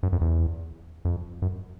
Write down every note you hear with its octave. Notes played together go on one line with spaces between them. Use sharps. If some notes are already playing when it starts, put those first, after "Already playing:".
F#2
F2
E2
F2
F#2